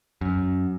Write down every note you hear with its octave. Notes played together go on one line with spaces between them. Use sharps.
F#2